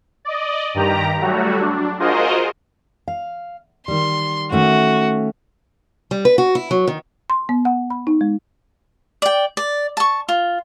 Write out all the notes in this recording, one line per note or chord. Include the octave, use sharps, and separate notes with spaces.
D5 D#5
G2 D#3 G4 A#5
F#3 G3 A3 F#4
D4
F4 F#4 G#4 A#4 C5 D#5
F5
D#3 G3 C6
D#3 A3 C#4 F#4
G3
B4
F#4
E4
F#3
D#3
C6
B3
F#5
B5
D#4
G#3
D5 G5
D5
A5 C#6
F4